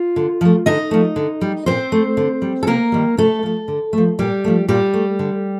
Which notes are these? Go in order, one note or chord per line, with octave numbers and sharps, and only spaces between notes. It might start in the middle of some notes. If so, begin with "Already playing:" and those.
Already playing: F4
D3
F3 A3
D3 D#4 D#5
F3 A3
D3
G3
A#2 C4 C5
A3
D3
G3
A4
C3 A#3 A#4
D#3 G3
C3 A3 A4
F3 A3
D3
F3 A3
A#2 G3 G4
F3 A3
A#2 G3 G4
A3
D3